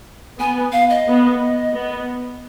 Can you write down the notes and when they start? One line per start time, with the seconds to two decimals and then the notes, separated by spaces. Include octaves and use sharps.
0.38 B3 G#5
0.72 F5
0.90 D#5
1.07 B3
1.74 B3